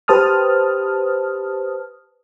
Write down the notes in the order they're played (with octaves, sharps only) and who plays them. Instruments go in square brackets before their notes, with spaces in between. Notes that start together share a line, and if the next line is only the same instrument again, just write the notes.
[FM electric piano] G4 B4 C5 A5 D#6 F6